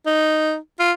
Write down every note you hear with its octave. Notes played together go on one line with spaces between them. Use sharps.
D#4
F4